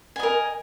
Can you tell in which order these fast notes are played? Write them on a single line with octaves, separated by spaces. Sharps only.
G#5 D#5 A#4